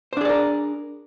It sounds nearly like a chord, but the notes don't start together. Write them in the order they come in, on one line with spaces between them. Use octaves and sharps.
C5 D4 G#4 D5 A#4